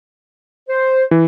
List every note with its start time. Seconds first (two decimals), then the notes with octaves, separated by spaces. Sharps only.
0.69 C5
1.11 E3